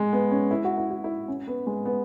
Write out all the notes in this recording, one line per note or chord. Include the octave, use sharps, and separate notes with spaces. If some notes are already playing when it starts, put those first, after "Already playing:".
Already playing: G#3
B3
C#4
E4
F#4
E4
F#4
E4
C#4
B3
G#3
B3